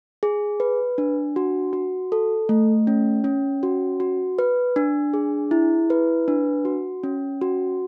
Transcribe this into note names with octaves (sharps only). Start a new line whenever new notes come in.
G#4
B4
D4
F#4
F#4
A4
A3
C#4
C#4
F#4
F#4
B4
D4
G#4
E4
B4
D4
F#4
C#4
F#4